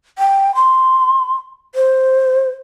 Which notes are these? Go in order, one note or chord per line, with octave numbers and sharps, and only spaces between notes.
G5
C6
C5